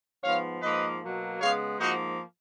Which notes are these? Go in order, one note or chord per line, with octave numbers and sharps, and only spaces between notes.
G#2 F3 B3 C#5 F5
G#2 F3 A#3 B4 D#5
B2 F#3 A#3
C#3 G#3 B3 C#5 F5
G#2 F3 A#3 D#4 F#4